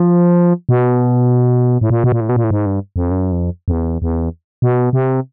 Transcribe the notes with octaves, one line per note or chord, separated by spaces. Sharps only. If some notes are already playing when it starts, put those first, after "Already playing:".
Already playing: F3
B2
A2
A#2
B2
A#2
A2
B2
A#2
A2
G#2
G2
F2
F#2
F2
F2
E2
E2
B2
C3